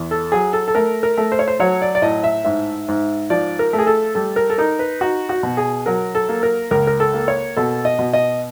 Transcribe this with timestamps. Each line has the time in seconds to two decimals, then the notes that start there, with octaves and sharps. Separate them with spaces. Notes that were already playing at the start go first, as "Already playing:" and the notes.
Already playing: E2
0.11 A4
0.32 F#3 G#4
0.53 A4
0.68 A4
0.75 A3 A#4
1.03 A#4
1.18 A3
1.32 C5
1.39 C#5
1.48 C5
1.60 F#3 C#5
1.82 D5
1.95 D5
2.02 A2 D#5
2.24 E5
2.45 G#2 E5
2.88 G#2
3.30 F3 D5
3.59 A#4
3.73 A3
3.79 G#4
3.87 A4
4.15 G3 A4
4.36 A#4
4.50 A4
4.58 D#4 A#4
4.79 B4
5.01 D#4 F#4
5.29 F#4
5.43 B2
5.57 G#4
5.86 F#3 A#4
6.15 A4
6.29 A#3
6.43 A#4
6.71 C#2 A#4
6.87 A#4
7.00 A4
7.14 A#3
7.28 C#5
7.57 B2 A4
7.85 D#5
7.99 B2
8.13 D#5